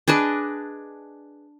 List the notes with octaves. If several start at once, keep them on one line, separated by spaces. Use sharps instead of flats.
D4 G#4 B4 D#5